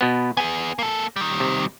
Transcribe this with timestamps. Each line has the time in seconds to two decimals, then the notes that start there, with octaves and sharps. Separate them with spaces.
0.01 B2 B3
0.37 B3 G#4 G#5
0.79 A#3 A4
1.16 D#3 G3
1.40 C3